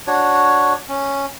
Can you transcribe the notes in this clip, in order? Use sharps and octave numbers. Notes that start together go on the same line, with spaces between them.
D4 F#4 C#5
C#4